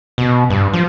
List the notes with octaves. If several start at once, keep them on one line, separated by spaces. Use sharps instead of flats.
B2
G2
F3